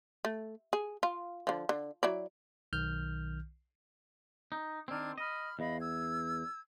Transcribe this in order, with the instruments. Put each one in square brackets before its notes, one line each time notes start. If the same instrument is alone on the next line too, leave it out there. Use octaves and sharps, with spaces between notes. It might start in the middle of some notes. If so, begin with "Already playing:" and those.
[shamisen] A3
G#4
F4
D3 F3
D3
F#3 E4 D5
[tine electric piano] B1 D#3 F6 G6
[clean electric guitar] D#4
[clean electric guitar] D#3 C4 [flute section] D4 F6 G#6
[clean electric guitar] D#5 [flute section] B5 F6
[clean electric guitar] E2 [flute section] D#5 F5 B5
[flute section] E6 G#6